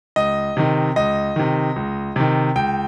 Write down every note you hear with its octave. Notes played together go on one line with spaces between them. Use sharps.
C#2 D#5
C3 D#3
C#2 D#5
C3 D#3
C#2
C3 D#3
C#2 G5